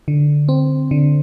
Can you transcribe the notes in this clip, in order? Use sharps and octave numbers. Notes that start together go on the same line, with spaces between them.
D3
C4
D3